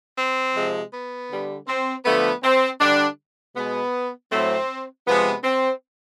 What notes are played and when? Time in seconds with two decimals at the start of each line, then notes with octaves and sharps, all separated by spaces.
0.17 C4
0.54 C3 F3 G#3
0.92 B3
1.29 D3 G3
1.68 C4
2.05 D3 F3 A3 B3
2.42 C4
2.80 D3 G3 D4
3.55 B2 G#3 B3
4.31 A2 F#3 A3 C4
5.06 C3 F3 G#3 B3
5.43 C4